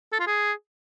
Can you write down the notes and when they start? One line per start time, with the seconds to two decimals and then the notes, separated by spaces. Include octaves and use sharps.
0.13 A4
0.20 F4
0.27 G#4